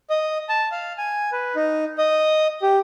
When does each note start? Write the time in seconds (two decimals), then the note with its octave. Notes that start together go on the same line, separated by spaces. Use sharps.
0.10 D#5
0.49 A5
0.71 F5
0.98 G#5
1.32 B4
1.56 D#4
1.98 D#5
2.62 G4